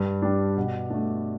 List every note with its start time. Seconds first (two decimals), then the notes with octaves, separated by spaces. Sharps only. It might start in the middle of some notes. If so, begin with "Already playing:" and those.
Already playing: G2
0.22 G3 D4
0.57 B2
0.90 A3 D4